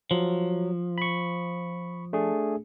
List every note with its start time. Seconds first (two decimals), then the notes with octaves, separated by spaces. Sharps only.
0.11 F3 F#3
0.98 B5 C#6
2.13 A3 D4 G#4